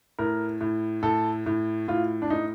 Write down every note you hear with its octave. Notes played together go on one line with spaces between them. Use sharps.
A2 A#4
A2
A2 A4
A2
A2 F4
D4
A2 D#4